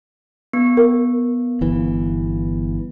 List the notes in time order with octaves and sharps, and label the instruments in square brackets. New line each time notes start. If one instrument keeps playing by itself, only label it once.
[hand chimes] B3
[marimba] A#4
[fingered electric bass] G1 E3